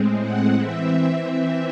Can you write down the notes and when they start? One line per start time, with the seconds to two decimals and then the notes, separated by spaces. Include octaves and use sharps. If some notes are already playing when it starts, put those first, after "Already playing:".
Already playing: A2 G#3 C4
0.22 F#5
0.57 E3 C4 E5
1.29 E5